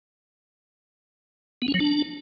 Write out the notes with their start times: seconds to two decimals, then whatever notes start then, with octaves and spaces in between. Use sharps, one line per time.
1.62 B3
1.68 C#4
1.74 F#3
1.80 D4